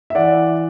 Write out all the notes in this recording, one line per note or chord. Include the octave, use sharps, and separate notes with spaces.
E5
E3 D5 F#5